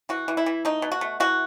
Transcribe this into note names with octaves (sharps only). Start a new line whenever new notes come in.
E3 F#4
E3
E4
E3
A3 D#4
B2
F#4
A3
E3 F#4